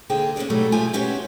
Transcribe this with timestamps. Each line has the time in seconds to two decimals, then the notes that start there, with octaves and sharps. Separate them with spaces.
0.10 D2 D3 A#3 G#4 C5 G5
0.36 C#4 D4 G#4 A#4 D5
0.50 G#2 B2 F#3 G3 A3
0.72 F3 F4 G4 E5 G#5
0.93 G#3 B3 C#4 F#4 G4 C#5